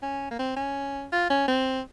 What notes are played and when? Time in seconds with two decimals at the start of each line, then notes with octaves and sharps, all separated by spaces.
0.02 C#4
0.31 A#3
0.39 C4
0.56 C#4
1.12 F4
1.30 C#4
1.48 C4